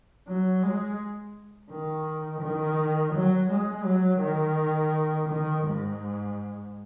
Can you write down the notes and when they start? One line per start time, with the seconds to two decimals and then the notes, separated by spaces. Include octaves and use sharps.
0.28 F#3
0.63 G#3
1.71 D#3
2.42 D#3
3.14 F#3
3.50 G#3
3.85 F#3
4.21 D#3
5.29 D#3
5.65 G#2